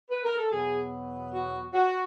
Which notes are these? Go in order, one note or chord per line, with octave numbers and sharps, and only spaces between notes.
B4
A#4
A4
E2 B2 F#3 B3 G#4
F#4
F#4